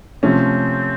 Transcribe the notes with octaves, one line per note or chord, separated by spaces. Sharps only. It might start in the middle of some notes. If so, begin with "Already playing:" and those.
C3 F3 A3 C4 C#4